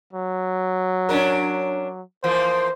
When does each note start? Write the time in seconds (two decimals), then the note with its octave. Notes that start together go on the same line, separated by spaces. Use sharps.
0.13 F#3
1.09 C#4 D4 A#4
2.24 E3 F3 A#3 C5